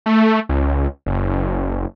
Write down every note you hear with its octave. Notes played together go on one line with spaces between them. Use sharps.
A3
C#2
F#1